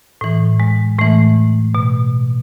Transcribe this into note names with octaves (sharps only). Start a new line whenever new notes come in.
A2 E3
G#3
A2 E3 A3
B2